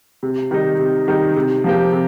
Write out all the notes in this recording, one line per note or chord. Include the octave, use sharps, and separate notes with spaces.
C3
D#3 G3 D#4
C3
D#3 G3 D#4
C3
F3 A#3 G4
C3